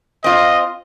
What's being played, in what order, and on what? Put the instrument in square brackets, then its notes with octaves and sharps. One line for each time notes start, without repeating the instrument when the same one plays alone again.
[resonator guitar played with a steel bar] C4 F4 [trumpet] D#5